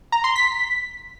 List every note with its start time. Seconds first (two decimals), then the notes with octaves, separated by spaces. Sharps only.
0.12 A#5
0.24 C6
0.36 B6